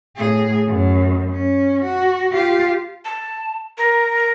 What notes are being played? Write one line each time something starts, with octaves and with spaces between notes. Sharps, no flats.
A2 G#4
F#2
C#4
F#4
F4 G4
A5
A#4